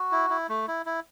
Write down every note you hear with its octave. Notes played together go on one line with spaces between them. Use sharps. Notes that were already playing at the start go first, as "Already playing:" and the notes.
Already playing: F#4
E4
E4
A3
E4
E4